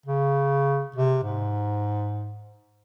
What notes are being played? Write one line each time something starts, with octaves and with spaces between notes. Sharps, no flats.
C#3
C3
G#2